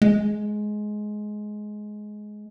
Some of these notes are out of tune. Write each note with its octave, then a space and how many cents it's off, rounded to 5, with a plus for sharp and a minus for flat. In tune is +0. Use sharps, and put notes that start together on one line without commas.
G#3 +15